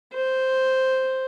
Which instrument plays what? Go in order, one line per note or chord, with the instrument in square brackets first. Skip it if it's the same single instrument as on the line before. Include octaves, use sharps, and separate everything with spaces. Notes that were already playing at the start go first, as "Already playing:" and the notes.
[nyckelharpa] C5